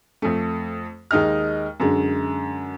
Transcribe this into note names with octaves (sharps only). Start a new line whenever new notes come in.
F2 A3
D#2 G#3 D#4 D#5 F6
F#2 D3 G#3